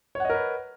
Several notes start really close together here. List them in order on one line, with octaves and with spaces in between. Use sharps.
C#5 F#5 D#5 A#4 B4